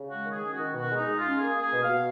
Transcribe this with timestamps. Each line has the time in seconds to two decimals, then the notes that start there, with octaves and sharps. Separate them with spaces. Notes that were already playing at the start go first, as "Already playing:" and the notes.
Already playing: C#3
0.09 G#3 F#4
0.26 D#3
0.32 G#4
0.43 C#4
0.53 D#3 F#4
0.74 B2 F#4
0.90 G#3
0.96 D#4
1.08 G#3
1.18 F4
1.24 C#4
1.39 A#3 G#4
1.57 A#3
1.62 G#4
1.73 B2
1.83 F5
1.88 B2